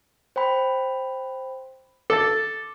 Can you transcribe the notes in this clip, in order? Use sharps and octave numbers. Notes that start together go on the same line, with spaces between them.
C5 G5 B5
A4 D6 A6